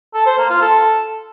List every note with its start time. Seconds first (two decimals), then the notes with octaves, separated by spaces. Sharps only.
0.14 A4
0.26 C5
0.38 A#3
0.50 F4
0.62 A4